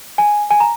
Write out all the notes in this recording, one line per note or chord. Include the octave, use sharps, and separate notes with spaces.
G#5
G#5
A#5